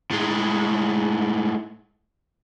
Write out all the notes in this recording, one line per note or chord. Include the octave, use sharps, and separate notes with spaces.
A2 G#3